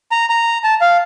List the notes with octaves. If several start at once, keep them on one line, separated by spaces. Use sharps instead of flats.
A#5
A#5
A5
F5